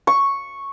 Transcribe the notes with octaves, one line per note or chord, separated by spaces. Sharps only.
C#6